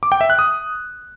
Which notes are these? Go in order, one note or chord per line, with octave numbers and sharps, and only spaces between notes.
D6
G5
E5
F#6
D#6